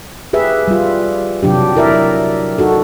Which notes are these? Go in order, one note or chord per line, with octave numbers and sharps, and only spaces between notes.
G4 G#4 B4 E5
G3 F4
C3 F#3 D4 G4
E4 A#4 D5 E5
D#4 F#4 A4